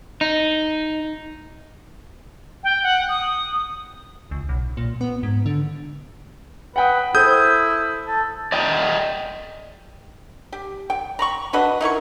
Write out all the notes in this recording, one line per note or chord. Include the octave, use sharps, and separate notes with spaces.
D#4
G5
F#5
D#6
C#2
B1
A#2
B3
G#2
D3
B4 F#5 G5 D#6
E4 A4 C5 D#6 G6
A4
D5 D#5 G5
G4
G5
A#5 B5 C#6
D4 F#4 B4 D#5
D#4 E4 A#4 C#6